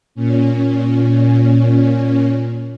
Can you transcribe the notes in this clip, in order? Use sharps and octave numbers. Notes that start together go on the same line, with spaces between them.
A#2 C#4